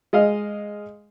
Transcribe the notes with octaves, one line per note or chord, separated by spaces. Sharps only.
G#3 D#5 F5